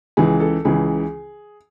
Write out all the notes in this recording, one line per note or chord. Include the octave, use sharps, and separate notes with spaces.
C#2 C#3 E3 G#4
A4
C#2 C#3 E3 G#4